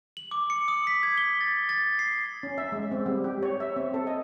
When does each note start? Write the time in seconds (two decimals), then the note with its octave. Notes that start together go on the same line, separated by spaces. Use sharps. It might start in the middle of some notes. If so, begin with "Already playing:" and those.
0.17 F#7
0.31 D6
0.50 C#7
0.68 D#6
0.87 B6
1.03 G#6
1.18 G7
1.41 A6
1.69 A6
1.99 C7
2.43 C#4
2.58 E5
2.72 G#3
2.92 C4
3.06 G3
3.24 G4
3.43 C#5
3.60 E5
3.76 C4
3.94 A4
4.07 D#5